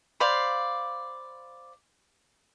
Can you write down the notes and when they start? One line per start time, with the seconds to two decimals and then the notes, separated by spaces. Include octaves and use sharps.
0.20 C5 D5 F5 B5